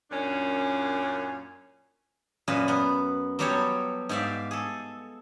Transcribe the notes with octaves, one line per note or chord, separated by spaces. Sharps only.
F#2 A#2 C#4 D4
F#2 A#2 G#4 B4
B3 B4
F#3 G3 B3 G4 A4 C#5
G#2 G4 D5 E5 F5
G#4 A4